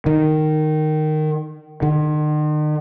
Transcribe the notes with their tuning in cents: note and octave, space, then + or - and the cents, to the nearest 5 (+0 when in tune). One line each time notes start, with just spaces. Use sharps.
D#3 -10
D#3 -45